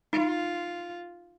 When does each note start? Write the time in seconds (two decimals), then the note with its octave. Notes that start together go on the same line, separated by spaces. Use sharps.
0.13 D#4 F4